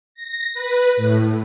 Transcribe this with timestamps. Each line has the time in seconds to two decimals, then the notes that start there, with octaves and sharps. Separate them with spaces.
0.14 A#6
0.54 B4
0.97 A2